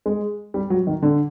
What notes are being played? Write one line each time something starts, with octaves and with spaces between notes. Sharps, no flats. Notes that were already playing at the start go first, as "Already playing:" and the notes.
G#3
G3
F#3
D#3
D3